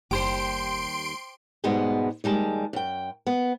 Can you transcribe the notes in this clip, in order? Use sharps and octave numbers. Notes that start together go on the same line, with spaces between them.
F#1 D#2 G3 G4 C5 C6 D7
G#2 B2 G3 G#3 B3
D#2 G3 G#3 A5
F#2 G5
B3